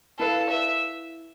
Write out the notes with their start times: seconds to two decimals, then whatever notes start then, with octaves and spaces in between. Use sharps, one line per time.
0.19 E4 A4 B4 F5
0.51 E5